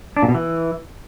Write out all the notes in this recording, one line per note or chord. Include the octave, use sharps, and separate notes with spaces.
D4
A#2
B2
E3